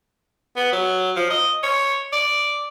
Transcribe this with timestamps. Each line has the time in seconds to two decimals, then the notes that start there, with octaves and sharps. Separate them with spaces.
0.56 B3
0.73 F#3
1.16 F3
1.30 D#5
1.63 C#5
2.13 D5